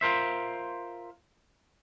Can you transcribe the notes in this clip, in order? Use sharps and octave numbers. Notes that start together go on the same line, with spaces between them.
F4 A#4 C5 E5